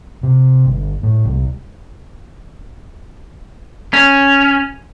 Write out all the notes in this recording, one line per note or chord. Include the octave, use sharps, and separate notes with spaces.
C3
G1
A2
C2
C#4